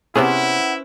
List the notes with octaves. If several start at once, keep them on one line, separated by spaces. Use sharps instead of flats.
C3 B3 C#4 E4 G#4 B4 C5 F#5